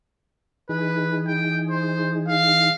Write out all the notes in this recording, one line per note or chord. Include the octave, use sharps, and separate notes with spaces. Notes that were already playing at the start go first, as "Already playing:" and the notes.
E3 D#4 G#4 B4
G5
C5
F5